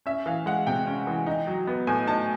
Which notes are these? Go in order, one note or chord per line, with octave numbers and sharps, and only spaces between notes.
C#4 E5
E3 F5
G#3 F#5
C3 G5
C#4
E3
D#4
F#3
B3
A2 G#5
D#4 A5